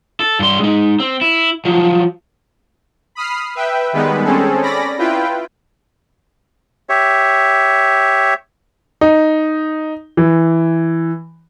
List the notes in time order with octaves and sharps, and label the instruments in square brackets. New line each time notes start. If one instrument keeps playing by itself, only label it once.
[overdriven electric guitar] A4
G2 C6
G#3 D#4
C4
E4
F3 F#3
[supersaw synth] B5 D#6 F6 C7
B4 E5 G5
D#3 G3 G#3 B3 B4
C4 C#4 G#4 A4
C#4 D5 B5 A#6
E4 F4 B4 G5
[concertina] G4 C#5 E5
[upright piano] D#4
E3